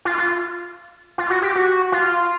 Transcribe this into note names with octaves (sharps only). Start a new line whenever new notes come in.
F4
F4
F4
F#4
G4
F#4
F4